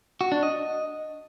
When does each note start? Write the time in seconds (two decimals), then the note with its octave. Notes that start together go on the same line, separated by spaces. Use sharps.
0.21 F#4
0.32 D4
0.43 D#5